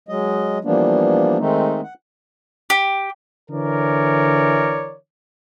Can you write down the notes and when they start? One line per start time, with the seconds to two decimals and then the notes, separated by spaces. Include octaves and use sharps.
0.09 F#3 G#3 D#5
0.65 E3 F3 G3 A#3 B3 D4
1.38 D#3 G#3 A3 C4 D#4
1.83 F#5
2.70 G4
3.51 D3 E3 A#4 C#5 D5